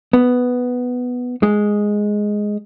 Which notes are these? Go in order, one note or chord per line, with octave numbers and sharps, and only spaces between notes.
B3
G#3